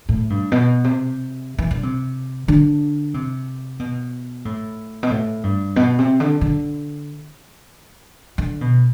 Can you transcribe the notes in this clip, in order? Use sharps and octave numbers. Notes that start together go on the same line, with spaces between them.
A2
G2
B2
C3
E3
D3
C3
D3
C3
B2
A2
B2
A2
G2
B2
C3
D3
D3
D3
B2